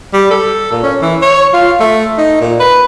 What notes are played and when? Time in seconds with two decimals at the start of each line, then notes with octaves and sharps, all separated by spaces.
0.14 G3
0.31 A4
0.72 A#2
0.83 C#4
1.02 E3
1.22 C#5
1.54 F4
1.80 A3
2.18 D#4
2.41 A#2
2.60 B4